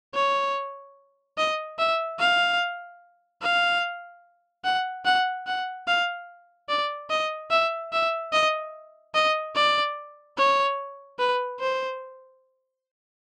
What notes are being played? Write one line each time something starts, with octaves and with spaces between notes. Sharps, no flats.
C#5
D#5
E5
F5
F5
F#5
F#5
F#5
F5
D5
D#5
E5
E5
D#5
D#5
D5
C#5
B4
C5